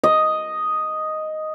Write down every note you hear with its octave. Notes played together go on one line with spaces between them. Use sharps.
D#5